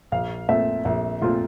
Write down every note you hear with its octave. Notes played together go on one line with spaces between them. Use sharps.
A#1 F5
A#2 A3 C4 E5
A#1 E5
A#2 A3 C4 F4